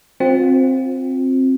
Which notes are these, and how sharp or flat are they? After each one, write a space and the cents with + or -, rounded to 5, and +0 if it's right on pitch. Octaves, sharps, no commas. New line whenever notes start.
C4 +10 F4 +35